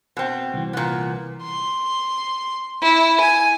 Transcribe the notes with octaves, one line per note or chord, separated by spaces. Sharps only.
B2 C4
C2 E3
A#2 B3
C6
E4
G#5